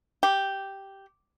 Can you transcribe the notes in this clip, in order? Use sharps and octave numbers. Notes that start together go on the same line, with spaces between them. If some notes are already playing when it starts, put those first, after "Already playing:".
G4